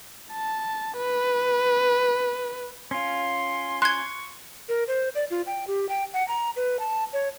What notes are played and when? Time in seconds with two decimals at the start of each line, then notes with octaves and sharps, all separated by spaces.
0.33 A5
0.97 B4
2.91 C#4 F4 C6
3.82 C6 C#6 F#6 G#6
4.69 A#4
4.88 C5
5.15 D5
5.31 F4
5.47 G5
5.67 G4
5.89 G5
6.14 F#5
6.28 A#5
6.56 B4
6.80 A5
7.13 C#5